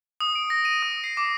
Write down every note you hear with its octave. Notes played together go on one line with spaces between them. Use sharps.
D#6
D7
A#6
D#7
D#6
C7
D6